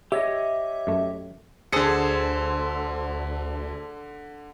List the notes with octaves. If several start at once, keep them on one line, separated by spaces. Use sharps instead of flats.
G4 C#5 D#5 E5
F#2 A3
D2 D3 G#4 A4 C5 C#7